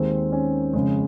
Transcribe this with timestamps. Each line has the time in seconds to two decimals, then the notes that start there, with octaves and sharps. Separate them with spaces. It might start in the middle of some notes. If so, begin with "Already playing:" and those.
Already playing: D#2 D#3 G#3 C4
0.32 C#4
0.73 F2 C#3 G#3